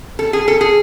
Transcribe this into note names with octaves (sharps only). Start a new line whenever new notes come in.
A4
G#4
A4
G#4